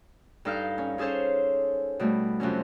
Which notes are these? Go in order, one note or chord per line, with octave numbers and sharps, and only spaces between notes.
G2 D#4 A4 F5 F6 G6
C#4
C#4 G#4 A4 C5 C#5
B2 G3 A3
F2 C3 F#3 C#4